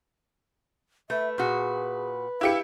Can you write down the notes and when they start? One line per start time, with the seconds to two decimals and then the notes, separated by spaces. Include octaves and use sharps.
1.10 A3 B4 E5
1.38 A#2 F#4 G#4
2.41 E4 G4 F5 C#7